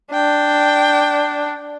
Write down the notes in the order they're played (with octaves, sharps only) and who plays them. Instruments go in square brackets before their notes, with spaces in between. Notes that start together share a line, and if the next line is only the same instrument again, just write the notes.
[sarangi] D4 [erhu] G5